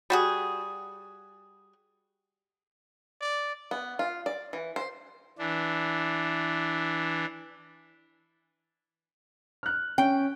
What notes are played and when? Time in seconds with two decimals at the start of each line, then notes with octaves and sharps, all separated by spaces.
0.10 G3 F#4 G#4
3.21 D5
3.71 B3
3.99 F4
4.26 D5
4.53 E3
4.76 C5
5.39 E3 D4
9.63 F6 F#6
9.98 C#4 G5